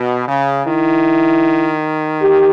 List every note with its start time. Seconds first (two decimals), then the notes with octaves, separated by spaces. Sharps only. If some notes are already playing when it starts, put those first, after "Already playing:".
Already playing: B2
0.27 C#3
0.65 D#3 E4
2.22 G4